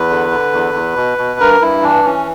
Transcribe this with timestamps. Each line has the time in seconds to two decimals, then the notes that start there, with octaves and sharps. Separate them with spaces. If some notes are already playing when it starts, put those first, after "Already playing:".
Already playing: E2 B4
0.09 D3
0.31 D3
0.53 E2
0.74 E2
0.96 B2
1.18 B2
1.40 G2 A#4
1.61 G2 E4
1.83 E3 D4
2.05 E3 C#4